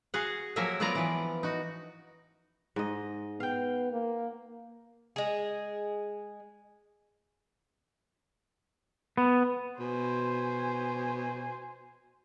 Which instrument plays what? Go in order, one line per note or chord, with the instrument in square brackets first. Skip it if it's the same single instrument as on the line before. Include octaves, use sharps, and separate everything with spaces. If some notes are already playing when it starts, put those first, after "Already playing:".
[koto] F#4 G#4 F5 F#5
F3 F#3 A#3 A#4 E5 G#5
F#3 B3 F4 A#4 D5 A#5
E3 F3
D#4 F#4
[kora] G#2 D#5
[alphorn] B3 [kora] F5 G5
[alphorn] A#3
[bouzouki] G#3 G#4
[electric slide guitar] B3
[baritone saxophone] B2 [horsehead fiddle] C5 G#5